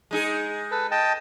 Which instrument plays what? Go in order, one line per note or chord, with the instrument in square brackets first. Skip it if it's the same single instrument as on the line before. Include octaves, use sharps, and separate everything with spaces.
[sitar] G#3 D#4 G#4
[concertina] A4 B4
D#5 G5 A5